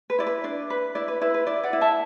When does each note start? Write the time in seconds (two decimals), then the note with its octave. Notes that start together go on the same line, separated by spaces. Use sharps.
0.10 B4
0.18 E4 D5
0.27 B4
0.44 D4 D5
0.70 B4
0.95 E4 D5
1.08 B4
1.21 E4 B4
1.34 B4
1.47 E4 D5
1.64 D5 F#5
1.73 E4
1.81 E5 A5